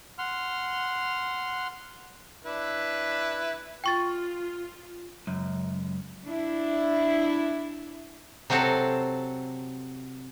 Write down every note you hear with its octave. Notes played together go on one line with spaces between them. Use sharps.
F#5 C6 F6
D4 E4 B4
F4 G5 C#6 A6
C#2 F#2
D4 E4
C3 F#3 C4 F#4 A4